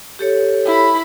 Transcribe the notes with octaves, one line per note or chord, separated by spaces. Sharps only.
G4 A4 C#5
E4 B5